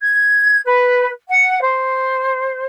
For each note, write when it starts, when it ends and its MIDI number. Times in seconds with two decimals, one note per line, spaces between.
0.01 0.60 92
0.65 1.09 71
1.28 1.60 78
1.62 2.66 72